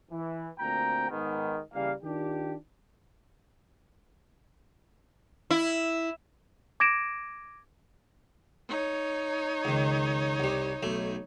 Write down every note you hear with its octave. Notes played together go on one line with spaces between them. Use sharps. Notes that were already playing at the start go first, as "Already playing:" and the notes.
E3
D2 A#2 C4 G5 A#5
G#2 D#3 B3
C#3 E3 G3 A#3 F5
D#3 D4 F4 G4
E4
D6 G#6 A#6 D7 E7
D#4 C#5
C#2 D#3
C2 G3
B1 A3